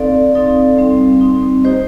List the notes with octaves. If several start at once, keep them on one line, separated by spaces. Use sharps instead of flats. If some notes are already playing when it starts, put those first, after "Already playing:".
Already playing: C4 D#4 A4 D5 F5
C4 D#4 A4 D5 F5
G3 C4 D#4
G3 C4 D#4
A#3 D#4 G4 C5 D#5